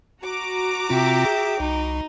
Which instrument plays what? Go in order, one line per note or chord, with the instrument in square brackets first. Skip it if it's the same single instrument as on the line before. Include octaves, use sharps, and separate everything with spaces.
[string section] F#4 A#5 D6
[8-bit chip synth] C3 C4 F4 [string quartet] E5 G5
[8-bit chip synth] G#4
[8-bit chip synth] C2 [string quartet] D#4